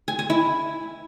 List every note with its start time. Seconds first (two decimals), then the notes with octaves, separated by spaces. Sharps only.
0.08 G#5
0.19 G#5
0.30 E4